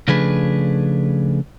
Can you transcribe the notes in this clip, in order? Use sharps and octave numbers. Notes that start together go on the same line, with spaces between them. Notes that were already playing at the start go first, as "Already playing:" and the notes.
C#3 F3 A3 D4 G#4 B4